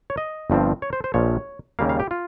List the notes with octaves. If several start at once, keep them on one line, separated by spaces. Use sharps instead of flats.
C#5
D#5
G1 G2 F3 C4
C#5
C5
C5
A#1 A#2 F3 C#5
D#2 C#3 G3 A#3 F5
F5
G4
F4